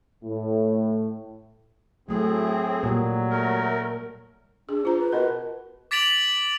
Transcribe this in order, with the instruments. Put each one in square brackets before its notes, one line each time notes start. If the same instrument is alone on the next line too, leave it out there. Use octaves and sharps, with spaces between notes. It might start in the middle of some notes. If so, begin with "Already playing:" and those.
[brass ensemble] A2
[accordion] A2 G#4 [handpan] F#3 A3 [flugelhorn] C4
[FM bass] A#2 [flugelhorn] F#3 [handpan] G3 A#3
[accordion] A3 A#4
[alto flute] D4 [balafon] G#4
[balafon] F4 A#5 [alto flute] C5
[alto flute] B4
[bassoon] B2 [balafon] A#4
[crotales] D6 A6 B6 D7 F7 F#7